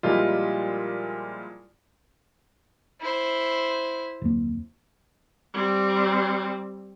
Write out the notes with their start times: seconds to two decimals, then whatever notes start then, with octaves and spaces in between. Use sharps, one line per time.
0.03 A#2 F3 G3 G#3 E4 F4
3.01 E4 C5
4.22 D1 F2 A#3
5.54 G3 C4